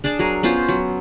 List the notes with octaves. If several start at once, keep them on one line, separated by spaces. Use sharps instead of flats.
D4 G#4 D5 A5
F#3 G#4 A#4
B3 C#4 F4 C5
F#3